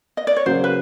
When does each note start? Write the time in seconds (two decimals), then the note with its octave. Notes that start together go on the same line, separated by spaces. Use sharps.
0.17 D#5
0.27 D5
0.36 C#5
0.46 C#3 F#3 A#3 C5
0.64 B4